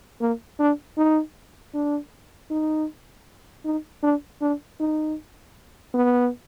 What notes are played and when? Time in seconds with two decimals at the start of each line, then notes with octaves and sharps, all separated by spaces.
0.21 A#3
0.59 D4
0.97 D#4
1.74 D4
2.50 D#4
3.65 D#4
4.03 D4
4.41 D4
4.80 D#4
5.94 B3